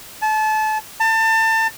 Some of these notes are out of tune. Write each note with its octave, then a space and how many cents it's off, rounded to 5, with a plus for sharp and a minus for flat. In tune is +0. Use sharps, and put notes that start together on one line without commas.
A5 -30
A5 +30